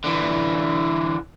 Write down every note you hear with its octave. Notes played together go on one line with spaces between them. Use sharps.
D3 E3